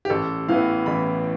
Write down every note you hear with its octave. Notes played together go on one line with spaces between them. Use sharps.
G4
A1 A4
A2 E3 B3 F5
A1 B5